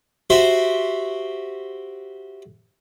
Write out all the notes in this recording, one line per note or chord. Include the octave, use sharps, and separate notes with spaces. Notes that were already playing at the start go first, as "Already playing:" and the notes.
F#4 G4 C5 E5